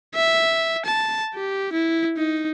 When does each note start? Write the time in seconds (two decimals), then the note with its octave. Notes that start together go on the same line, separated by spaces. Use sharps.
0.15 E5
0.86 A5
1.35 G4
1.73 E4
2.17 D#4